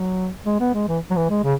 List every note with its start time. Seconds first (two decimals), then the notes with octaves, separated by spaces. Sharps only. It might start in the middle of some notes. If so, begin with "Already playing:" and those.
Already playing: F#3
0.46 G#3
0.60 B3
0.74 G#3
0.88 E3
1.11 F#3
1.16 E3
1.30 G#3
1.44 C#3